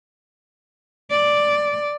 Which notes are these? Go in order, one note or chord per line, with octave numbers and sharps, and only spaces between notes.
D5